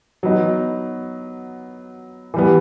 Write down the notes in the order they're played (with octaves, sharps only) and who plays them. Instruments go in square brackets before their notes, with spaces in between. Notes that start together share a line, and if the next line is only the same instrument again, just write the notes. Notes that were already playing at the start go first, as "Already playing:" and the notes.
[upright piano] F#3 B3 D#4
E3 G3 B3